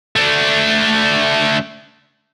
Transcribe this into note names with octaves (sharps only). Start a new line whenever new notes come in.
A3 D4